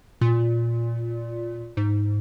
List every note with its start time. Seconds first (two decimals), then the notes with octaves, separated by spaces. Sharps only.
0.21 A#2
1.77 G#2